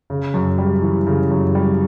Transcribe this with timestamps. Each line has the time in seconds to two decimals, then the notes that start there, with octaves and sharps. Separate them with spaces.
0.10 C#3
0.34 F#2
0.58 G3
0.82 E3
1.07 C#3
1.31 F#2
1.55 G3